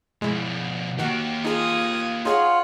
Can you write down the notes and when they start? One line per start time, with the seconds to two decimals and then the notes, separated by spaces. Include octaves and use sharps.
0.22 B2 F3 G#3 E4
0.99 D#3 A#3 F#4 G4
1.45 D#4 F4 G#4 D#6 G#6
2.25 D#4 F4 G#4 C#5 F#5